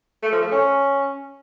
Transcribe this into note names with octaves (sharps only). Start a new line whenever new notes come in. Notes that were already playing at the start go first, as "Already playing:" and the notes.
A3
F3
A3
C#4